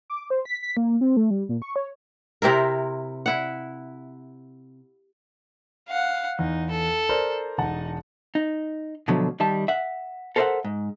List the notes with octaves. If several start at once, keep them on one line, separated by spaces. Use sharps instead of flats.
D6
C5
B6
B6
A#3
C4
A3
G3
A#2
C#6
C#5
C3 C4 E4 A#4
E4 F#5
F5 F#5
E2 D#4
A4
A#4 C5 D5
E1 D#4 F#5 A5
D#4
B2 D3 F3 F#3 A3
D#3 G3 E5 A5
E5 F#5
A4 A#4 C5 C#5 E5 F#5
G#2